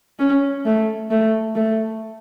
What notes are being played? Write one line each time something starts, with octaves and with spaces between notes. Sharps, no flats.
C#4
A3
A3
A3